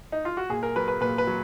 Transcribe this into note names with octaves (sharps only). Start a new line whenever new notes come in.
D#4
F4
F#4
A#2 G#4
A#4
F#3 B4
B4
A#2 B4
B4
F#3